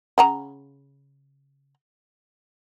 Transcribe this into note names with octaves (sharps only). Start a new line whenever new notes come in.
C#3 F#5 A#5